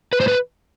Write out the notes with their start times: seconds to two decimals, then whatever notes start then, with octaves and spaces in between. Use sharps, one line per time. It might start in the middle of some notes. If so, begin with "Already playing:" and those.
0.13 B4
0.20 A2 C5
0.28 B4